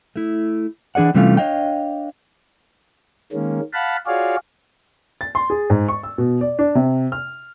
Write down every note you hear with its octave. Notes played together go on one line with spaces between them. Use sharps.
A3 E4
E3 D4 G#4 D5 F#5
C3 E3 G3 A3 C#4 F4
D4 C#5 D#5 F5 G5
D#3 G#3 A#3 C#4
F5 F#5 A5 B5
F4 F#4 G#4 C#5 D5 F5
A6
C6
G#4
G#2
C#6
E6
B2
D5
D4
C3
F6